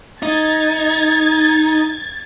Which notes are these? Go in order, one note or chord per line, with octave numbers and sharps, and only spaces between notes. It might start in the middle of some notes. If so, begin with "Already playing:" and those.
D#4 G#6 A6